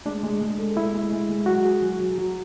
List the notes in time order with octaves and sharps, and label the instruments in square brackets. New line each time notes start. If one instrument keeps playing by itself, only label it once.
[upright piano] G#3 [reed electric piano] D4
[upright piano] G#3
G#3
A4
[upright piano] G#3 [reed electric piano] E4
[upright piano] G#3
G#3
G#3
[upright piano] F#3 [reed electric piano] F#4
[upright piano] G#4
F#3
F#3
F#3